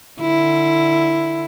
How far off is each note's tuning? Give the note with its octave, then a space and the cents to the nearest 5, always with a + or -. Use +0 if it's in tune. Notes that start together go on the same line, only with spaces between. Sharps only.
D3 +30 E4 +0